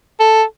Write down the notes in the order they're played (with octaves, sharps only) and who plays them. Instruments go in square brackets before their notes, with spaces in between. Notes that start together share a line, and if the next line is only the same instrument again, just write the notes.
[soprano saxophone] A4